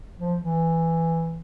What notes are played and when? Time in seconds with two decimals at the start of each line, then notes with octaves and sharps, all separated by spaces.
0.19 F3
0.40 E3